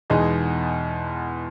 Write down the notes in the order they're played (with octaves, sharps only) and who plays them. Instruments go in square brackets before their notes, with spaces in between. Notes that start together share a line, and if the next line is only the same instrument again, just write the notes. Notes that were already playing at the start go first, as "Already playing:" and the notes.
[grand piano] E2 [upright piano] B2 G#3 D#4 G#4 D#5